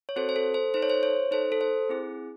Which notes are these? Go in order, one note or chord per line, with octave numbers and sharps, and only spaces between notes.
C#5
C4 F#4 A4 C5
C5
A4
C5
D#4 A4 C5
C#5
C5
C#5
D#4 A4 C5
A4
C5
C4 E4 G#4